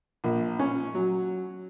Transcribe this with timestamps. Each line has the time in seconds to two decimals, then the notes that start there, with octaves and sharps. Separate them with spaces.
0.24 A#1
0.59 C#4
0.95 F#3